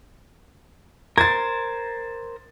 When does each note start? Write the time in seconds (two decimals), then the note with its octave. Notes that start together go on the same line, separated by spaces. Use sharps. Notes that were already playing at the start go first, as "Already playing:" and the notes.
1.18 A#4 C5 G#6 A6